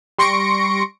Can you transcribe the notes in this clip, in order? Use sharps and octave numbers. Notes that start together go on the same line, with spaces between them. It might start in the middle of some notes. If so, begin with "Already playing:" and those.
G3 C6 C#6 A#6 C#7 D7